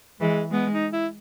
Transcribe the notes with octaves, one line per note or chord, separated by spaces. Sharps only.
E3 G#3
G#3 B3
D#4
E4